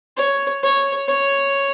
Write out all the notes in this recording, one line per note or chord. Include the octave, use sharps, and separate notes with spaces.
C#5
C#5
C#5